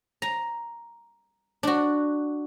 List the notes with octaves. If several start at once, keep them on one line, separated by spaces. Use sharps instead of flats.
A#5
D4 F#4